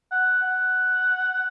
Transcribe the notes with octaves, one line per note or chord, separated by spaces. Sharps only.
F#5
F#5